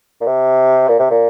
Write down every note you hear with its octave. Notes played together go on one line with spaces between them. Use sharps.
A#2
C3
A#2
C3
A#2